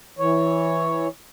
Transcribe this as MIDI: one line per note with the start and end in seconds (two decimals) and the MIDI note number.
0.19 1.08 52
0.19 1.08 73